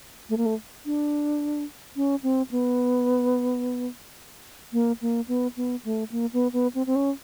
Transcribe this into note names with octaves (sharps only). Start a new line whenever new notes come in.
A3
A#3
A3
D4
C#4
C4
B3
A#3
A#3
B3
B3
A3
A#3
B3
B3
C4
C4
C#4